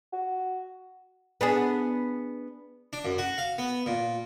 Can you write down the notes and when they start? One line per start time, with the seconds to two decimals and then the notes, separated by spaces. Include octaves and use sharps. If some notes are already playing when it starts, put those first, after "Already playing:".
0.13 F#4
1.41 B3 D4 G#4
2.93 D4
3.05 F#2
3.18 F#4
3.38 F5
3.58 B3
3.86 A#2